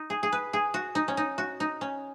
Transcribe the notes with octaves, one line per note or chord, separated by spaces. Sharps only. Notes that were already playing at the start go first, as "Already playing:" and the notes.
Already playing: D#4
G#4
G#4
B4
G#4
F#4
D#4
C#4
D#4
F#4
D#4
C#4